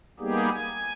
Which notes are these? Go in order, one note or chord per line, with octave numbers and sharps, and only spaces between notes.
G3 A#3 B3 D#4 G4 G#4
G#5